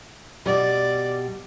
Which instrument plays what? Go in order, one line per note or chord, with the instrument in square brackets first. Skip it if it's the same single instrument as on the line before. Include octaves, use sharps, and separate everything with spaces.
[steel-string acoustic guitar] B2 G3 [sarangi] D5